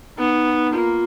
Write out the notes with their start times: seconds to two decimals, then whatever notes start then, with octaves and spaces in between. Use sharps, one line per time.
0.18 B3 D#4
0.72 A#3 F4